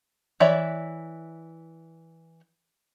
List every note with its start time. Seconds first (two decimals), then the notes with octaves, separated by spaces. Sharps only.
0.40 E3 C#5 D5 E5 B5